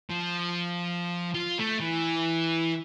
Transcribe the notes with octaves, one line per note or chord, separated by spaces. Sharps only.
F3
F4
A3
E3